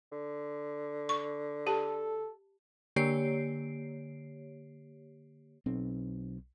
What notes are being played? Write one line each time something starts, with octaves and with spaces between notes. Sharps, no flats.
D3
C#6
G4 A4 A5
D3 A#3 G4 C#5 C7 D7
B1 C4